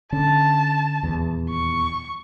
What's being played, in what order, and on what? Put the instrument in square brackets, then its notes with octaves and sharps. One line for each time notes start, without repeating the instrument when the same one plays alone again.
[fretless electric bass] D3 C#4 [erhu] A5
[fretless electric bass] D#1 E2
[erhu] C#6